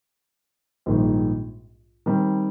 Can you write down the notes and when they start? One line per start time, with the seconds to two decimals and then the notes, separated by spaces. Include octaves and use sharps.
0.86 A#1 G#2 D#3 G3
2.06 D#3 G3 C4